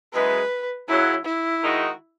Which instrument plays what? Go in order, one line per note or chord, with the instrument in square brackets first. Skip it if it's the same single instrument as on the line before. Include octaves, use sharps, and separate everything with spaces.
[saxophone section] F#2 E3 G#3 [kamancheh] B4
[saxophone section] F#2 C#3 F#3 [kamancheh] E4
[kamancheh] E4
[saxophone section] D#3 G#3 D#4 F#4